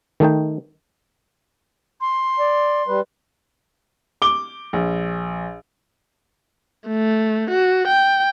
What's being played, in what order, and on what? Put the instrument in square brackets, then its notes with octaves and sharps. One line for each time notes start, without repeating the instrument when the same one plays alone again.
[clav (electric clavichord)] D#3 A3 D#4 G5
[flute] C6
[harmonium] D5
G3 B4
[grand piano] D6 G7
A#1
[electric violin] A3
F#4
G5